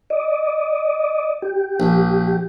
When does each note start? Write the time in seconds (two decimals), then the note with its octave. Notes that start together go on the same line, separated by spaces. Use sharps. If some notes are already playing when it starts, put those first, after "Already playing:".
0.10 D5 D#5
1.42 G4
1.80 A#1